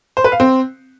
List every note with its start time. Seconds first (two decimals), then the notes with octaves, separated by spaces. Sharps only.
0.17 C5
0.24 B4
0.32 F5
0.40 C4